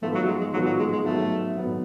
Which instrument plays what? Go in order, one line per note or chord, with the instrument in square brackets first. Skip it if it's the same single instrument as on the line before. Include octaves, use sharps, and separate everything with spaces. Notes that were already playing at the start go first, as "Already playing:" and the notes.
[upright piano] G#2 F3 B3 F4 A4 [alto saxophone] A3
[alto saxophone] F#3
G#3
G#3
[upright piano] G#2 F3 B3 F4 A4 [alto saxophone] F#3
[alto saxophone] F#3
G#3
G#3
[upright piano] G#2 F#3 B3 [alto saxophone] A3
[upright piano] G#2 F#3 B3